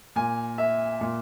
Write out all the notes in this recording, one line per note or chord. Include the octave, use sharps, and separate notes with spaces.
A#2 G#5
E5
A#2